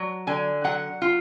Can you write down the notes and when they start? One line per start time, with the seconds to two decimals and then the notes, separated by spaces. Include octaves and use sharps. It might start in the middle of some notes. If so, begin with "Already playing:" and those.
Already playing: F#3
0.27 D3 G#5
0.64 F#3 F#5
1.02 F4